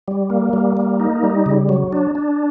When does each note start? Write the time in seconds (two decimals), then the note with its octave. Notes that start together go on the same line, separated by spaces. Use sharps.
0.08 G3
0.30 A#3
0.53 G3
0.77 A#3
1.00 D#4
1.23 G3
1.46 C#3
1.69 F#3
1.92 D4
2.15 D4